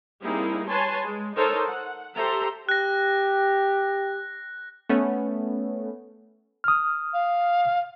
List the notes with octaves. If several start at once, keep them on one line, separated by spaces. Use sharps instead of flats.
G3 A#3 C4 D#4 E4 G#4
B4 C#5 G#5 A5 C6
G#3
D#4 A4 A#4 C5 C#5
F#5
G4 A4 C5 E5 A#5
G4 F#6 A#6
A3 B3 C#4
D#6 F6
F5